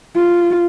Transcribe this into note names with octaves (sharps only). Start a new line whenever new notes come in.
F4